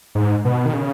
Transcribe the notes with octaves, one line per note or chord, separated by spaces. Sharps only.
G#2
B2
D#3
C#3